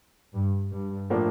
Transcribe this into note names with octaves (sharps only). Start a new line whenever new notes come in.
G2
G2
A2 F3 A#3 D4